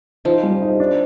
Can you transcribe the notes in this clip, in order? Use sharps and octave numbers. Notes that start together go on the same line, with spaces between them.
F3 D#4
G3
D#4
D4